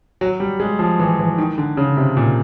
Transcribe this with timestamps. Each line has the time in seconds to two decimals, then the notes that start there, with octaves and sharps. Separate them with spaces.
0.21 F#3
0.40 G3
0.60 G#3
0.79 F3
0.99 E3
1.19 E3
1.38 D#3
1.58 D3
1.77 C#3
1.97 C3
2.17 A#2